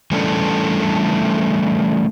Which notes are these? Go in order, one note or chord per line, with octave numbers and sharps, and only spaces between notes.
E3 G3 A3 C#4 D4 A4